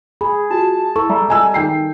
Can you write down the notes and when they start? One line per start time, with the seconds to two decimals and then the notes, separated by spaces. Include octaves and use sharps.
0.21 G#4 B5
0.50 F4 F#4 A5
0.96 E4 A4 C#6
1.10 G3 E5 A#5
1.28 D#5 G#5 E6
1.54 D#3 G5 C7